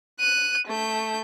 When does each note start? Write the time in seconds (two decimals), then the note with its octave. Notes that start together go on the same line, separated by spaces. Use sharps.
0.20 F#6 D#7
0.67 A3 G6